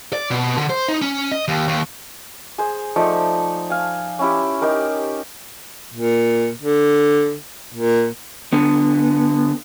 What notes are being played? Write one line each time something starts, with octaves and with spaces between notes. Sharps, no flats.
D5
B2
D3
C5
D#4
C#4
D#5
D#2
D#2
G#4 C5 G#5
F3 A3 D#4 D5
F5 G#5
C#4 E4 G4
D#4 G4 A#4
A#2
D3
A#2
D3 B3